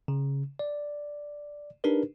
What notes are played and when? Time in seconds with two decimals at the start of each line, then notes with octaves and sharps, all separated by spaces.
0.08 C#3
0.59 D5
1.84 D4 D#4 G4 A#4 B4